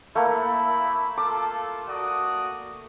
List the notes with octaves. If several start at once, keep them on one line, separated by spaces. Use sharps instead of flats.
A3 A#3 E4 B5
F4 A4 D6
F#4 D5 D#6